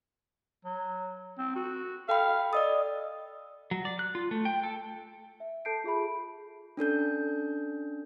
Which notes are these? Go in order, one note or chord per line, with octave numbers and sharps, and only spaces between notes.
F#3
C4
F#4
A4 F5 G5 B5
A4 D5 D#5 D#6
F#3
D5
F#6
F4
A3
G5
A4
E5
A4 A5 G6 C7 D7
F4 G#4 E5 B5
C#4 D4 A4 G6